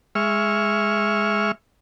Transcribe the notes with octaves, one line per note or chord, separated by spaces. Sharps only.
G#3 E5 C#6 F6